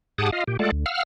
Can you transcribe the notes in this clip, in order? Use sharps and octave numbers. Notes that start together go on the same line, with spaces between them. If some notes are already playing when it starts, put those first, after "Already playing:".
G#2 G4 G#4 F#5 A5 D#6
F4 D#5 F5
A#2 G4
G#3 A3 F4 A4 D5 F#5
D2
F5 F#5 E6 F6